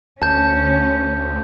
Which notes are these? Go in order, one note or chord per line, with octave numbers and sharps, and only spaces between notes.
D2 C#4 A5 G6